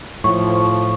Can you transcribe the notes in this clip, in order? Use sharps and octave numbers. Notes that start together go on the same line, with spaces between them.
A2 F3 C#6